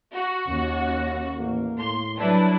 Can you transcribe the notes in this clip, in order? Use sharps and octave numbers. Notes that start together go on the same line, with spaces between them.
F#4
D#2 C#4
A1 A#3
A2 C6
F#3 G3 D4 E4 B4